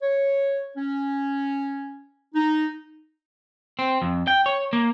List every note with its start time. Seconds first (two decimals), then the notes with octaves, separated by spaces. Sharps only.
0.02 C#5
0.76 C#4
2.35 D#4
3.79 C4
4.02 F2
4.27 G5
4.46 C#5
4.73 A#3